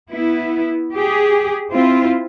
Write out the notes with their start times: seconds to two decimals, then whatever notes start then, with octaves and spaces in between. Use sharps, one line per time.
0.12 B3 E4
0.94 G4 G#4
1.72 C4 E4 F4